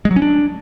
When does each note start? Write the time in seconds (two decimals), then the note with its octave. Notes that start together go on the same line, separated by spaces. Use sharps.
0.05 G#3
0.11 F#3
0.16 C#4
0.22 D4